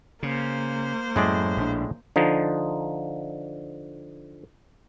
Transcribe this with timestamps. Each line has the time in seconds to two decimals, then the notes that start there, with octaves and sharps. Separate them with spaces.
0.23 C#3 A#3 C5
1.16 F#2 A2 G#3 D5
1.57 A#1 D4
2.16 D3 F3 D#4